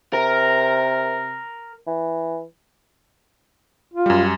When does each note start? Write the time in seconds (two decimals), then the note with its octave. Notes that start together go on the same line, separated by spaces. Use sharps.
0.13 C3 A#4
1.87 E3
3.94 F4
4.06 F#2 G3